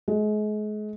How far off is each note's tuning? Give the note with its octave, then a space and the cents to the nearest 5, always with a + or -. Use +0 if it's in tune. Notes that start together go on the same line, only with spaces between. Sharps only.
G#3 +35